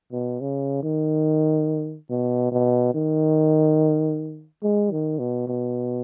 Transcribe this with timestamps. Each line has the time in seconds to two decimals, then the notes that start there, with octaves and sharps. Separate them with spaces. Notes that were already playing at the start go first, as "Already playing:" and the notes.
0.12 B2
0.40 C#3
0.83 D#3
2.10 B2
2.52 B2
2.94 D#3
4.63 G#3
4.91 D#3
5.19 B2
5.47 B2